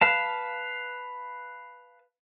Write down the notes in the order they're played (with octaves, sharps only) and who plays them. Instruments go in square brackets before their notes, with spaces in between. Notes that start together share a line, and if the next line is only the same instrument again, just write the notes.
[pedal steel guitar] B4 F5 A5